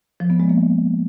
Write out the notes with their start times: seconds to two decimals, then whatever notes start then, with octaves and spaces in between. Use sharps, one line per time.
0.20 F3
0.30 B3
0.40 G#3
0.49 A#3